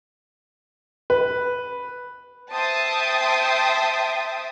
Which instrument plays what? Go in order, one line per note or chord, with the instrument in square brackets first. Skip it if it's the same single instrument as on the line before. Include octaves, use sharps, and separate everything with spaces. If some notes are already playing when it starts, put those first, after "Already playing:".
[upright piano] B4
[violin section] C5 E5 G5 A5 D#6